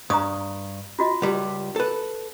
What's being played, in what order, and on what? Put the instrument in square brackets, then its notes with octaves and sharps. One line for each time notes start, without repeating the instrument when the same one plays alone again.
[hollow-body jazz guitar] G2 [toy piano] A#5 C#6 D#6
[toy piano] F4 F#4 D#5
[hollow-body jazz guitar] C#2 G3
A4 B4